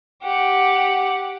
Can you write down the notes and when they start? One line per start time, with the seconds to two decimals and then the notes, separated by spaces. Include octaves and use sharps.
0.22 G4 F#5